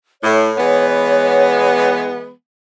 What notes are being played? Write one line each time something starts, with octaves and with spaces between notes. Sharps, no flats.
A2 C#5
E3 G#3 B3